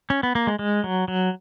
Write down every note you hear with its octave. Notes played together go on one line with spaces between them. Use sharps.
C#4
B3
A#3
G#3
G#3
F#3
F#3